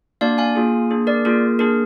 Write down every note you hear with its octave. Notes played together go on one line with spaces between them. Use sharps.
A#3 D4 F#4 D5 F5
F5 G#5
A#3 F4 G#4
A#3 D4 G#4
A#4 D5
A#3 F4 G#4 A#4
A#3 D4 G#4 A#4